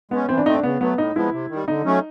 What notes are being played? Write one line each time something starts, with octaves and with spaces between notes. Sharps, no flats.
G#3 B3 C#4
E3 C4
D4
A3 C4 D#4
D4
C#3 B3
F#3 A3 B3
A2 D#4
F3 G#3 B3 E4
C3
D#3
G3
D3 D#4
F#3 A3 C#4